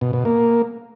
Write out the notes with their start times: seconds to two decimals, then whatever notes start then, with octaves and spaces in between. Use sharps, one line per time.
0.01 B2
0.13 B2
0.25 A#3